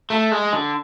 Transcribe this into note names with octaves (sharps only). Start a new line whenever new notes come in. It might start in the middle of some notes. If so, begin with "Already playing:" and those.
A3
G#3
D3